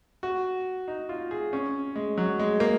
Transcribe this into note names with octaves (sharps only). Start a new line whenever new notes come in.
F#4
D#4
F4
G#4
C#4
G#3
F#3
G#3
A#3